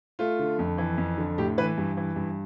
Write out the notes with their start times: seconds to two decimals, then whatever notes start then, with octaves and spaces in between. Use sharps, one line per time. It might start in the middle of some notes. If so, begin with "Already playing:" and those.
0.19 A3 F4
0.39 D3
0.59 F2
0.78 E3
0.97 F2
1.18 D3
1.38 A2 G4
1.58 E3 B4
1.78 G2
1.97 E3
2.16 G2